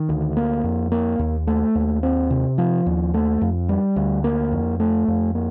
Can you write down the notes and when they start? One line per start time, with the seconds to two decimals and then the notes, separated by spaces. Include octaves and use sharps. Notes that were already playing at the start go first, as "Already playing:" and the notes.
Already playing: D#3
0.09 D2
0.37 A#3
0.64 F2
0.92 A#3
1.19 D#2
1.47 A3
1.75 D#2
2.03 C4
2.31 C3
2.58 F3
2.86 D#2
3.14 A3
3.41 F2
3.69 G3
3.96 D2
4.24 A#3
4.52 F2
4.80 A3
5.08 F2
5.35 A#3